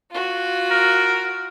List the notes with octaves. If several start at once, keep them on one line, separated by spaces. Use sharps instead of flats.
F4 F#4
A#4